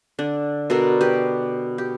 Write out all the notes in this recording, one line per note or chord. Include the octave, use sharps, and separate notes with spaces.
D3 D4
B2 D4 A4 A#4
G4 B4
G4